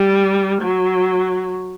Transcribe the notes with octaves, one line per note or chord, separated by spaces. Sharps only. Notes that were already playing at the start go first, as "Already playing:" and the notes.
Already playing: G3
F#3